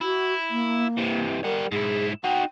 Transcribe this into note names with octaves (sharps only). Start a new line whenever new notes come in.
E4 F#4
A#3
C3 E3
G3 A#4 F#5
G#2 E4 G#4
D#4 F#4 G5